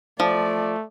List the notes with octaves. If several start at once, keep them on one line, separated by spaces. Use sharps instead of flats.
F3 A3 D5